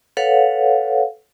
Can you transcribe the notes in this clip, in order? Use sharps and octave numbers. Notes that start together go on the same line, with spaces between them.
A4 B4 C#5 F5 F#5